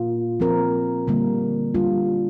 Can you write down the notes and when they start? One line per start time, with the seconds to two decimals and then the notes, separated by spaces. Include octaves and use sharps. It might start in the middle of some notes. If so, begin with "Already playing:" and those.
Already playing: A#2 A#3 F4
0.40 F3 C4 A#4
1.07 D3 G3 A#3
1.74 D3 G3 D4 F4